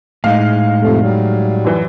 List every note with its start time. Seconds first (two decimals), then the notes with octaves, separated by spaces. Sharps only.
0.24 A2 G#3 D#4 F5
0.82 F2 C3 A3
1.02 F#3 G3
1.65 F#2 E3